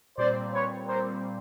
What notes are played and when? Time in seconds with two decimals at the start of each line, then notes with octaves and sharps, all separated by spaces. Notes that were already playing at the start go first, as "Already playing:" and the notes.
0.17 A#2 G3 C4 C5 D5
0.52 B4 C#5
0.87 A#2 G3 C4 A#4 C5